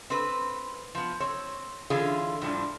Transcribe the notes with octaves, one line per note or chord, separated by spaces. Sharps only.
C4 B4
F3 B3
C4 C#5
D3 E3 C#4 F4 G#4
A2 F3 G3 D4